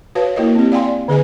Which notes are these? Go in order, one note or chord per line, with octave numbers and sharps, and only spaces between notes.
F#4 B4 C#5 F5 A5
A#3 E4 F#4 A#4 D#5
C4 G4
D5 F5 G5 G#5 C6
D3 G#4 D#5 G#5